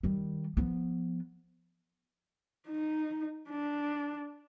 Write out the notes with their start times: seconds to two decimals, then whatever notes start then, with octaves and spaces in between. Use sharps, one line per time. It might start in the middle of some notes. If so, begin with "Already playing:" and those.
0.03 D#3 G3
0.57 F3 B3
2.68 D#4
3.50 D4